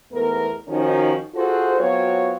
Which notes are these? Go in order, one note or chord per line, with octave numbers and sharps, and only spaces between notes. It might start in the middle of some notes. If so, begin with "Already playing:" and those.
E2 G#2 A3 B3 A#4
D#3 F3 C#4 D#4 F#4
F4 F#4 G#4 A4 C5
F#3 B3 C4 F4 F#4 C#5